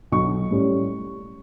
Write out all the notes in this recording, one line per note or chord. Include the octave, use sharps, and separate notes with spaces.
B1 C#6
A2 G3 C#4